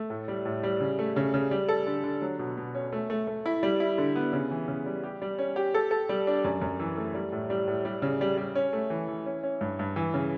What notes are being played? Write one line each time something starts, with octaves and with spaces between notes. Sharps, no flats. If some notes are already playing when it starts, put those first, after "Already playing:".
Already playing: A3
A2
G3
A2
G3
C#3
A3
C#3
C#3
G3
A4
D3
D3
F#3
B2
B2
C#4
A3
A3
A3
E4
G3
E4
D3
B3
C#3
E3
C#3
G3
G4
G3
C#4
G4
A4
A4
G3
D4
F#2
F#2
E3
A3
G3
A2
G3
A2
G3
C#3
G3
G3
C#4
A3
E3
E3
C#4
C#4
G2
G2
E3
C#3